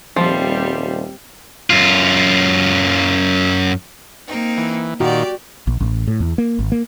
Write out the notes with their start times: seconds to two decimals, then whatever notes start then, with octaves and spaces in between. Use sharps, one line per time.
0.16 D#1 F3 G3 C4
1.70 F#2 F4
4.27 A#3 C4 D#4
4.57 E3
5.00 A#2 D#3 F#4 G4 D5
5.67 A#1
5.80 A1
6.07 A2
6.20 E2
6.38 A#3
6.59 G#1
6.72 A#3